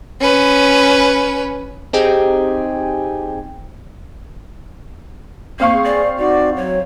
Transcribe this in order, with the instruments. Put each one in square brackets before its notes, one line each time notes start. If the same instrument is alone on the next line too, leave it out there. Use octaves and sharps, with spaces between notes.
[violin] C#4 B4
[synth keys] C4 D#4 G4 G#4 G5 G#5
[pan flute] A#3 [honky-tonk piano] C4 F5 C#6
[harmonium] G#4
[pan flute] D5
[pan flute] D#4 [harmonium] F#4 D5
[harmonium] F#3 [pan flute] C#5